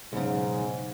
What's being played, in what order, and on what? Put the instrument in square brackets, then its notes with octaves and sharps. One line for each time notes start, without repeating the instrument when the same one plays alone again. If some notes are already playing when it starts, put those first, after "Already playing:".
[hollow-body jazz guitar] B1 C#3 [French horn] G#2